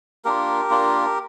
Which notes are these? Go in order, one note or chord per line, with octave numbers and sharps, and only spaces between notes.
A#3 D4 F4 G4 A#4
A#3 D4 F4